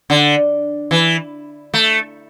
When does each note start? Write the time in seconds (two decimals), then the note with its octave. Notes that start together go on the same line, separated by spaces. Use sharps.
0.10 D3
0.91 E3
1.74 A3